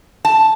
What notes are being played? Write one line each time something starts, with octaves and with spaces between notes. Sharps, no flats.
A5